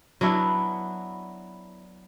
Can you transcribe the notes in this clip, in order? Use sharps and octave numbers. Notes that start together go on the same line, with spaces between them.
F#3 B3 D4 E4